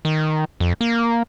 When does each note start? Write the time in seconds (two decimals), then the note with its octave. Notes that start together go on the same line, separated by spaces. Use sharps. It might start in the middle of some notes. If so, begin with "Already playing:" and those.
0.05 D#3
0.60 F2
0.81 A#3